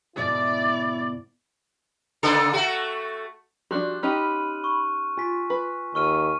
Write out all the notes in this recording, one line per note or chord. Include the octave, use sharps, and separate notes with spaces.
D2 G#2 B2 E4 D5
C#3 A#3 A4
A3 F#4
F3 G3 D4 F#4 C6 F#6
C#4 D#4 G4 B5 F6 D#7
C#6
F4 G#5 B6
B4
D#2 C#6 F6 D#7